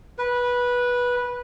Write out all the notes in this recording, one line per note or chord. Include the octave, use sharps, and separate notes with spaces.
B4